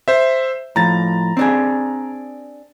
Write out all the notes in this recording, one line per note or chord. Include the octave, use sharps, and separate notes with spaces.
C5 E5
A2 F3 A#5 A6
C4 D4 G#4